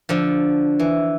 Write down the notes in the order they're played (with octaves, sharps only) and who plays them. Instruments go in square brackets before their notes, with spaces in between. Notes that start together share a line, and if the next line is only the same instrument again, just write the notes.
[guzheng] D3 F3
E3